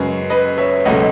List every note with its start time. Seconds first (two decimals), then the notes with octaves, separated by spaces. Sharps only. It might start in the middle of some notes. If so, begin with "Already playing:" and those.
Already playing: F#2 C#3 G#3 G#4 B4
0.30 B4 D#5
0.58 C#5 E5
0.85 C#2 B2 F#3 A3 D#5 F#5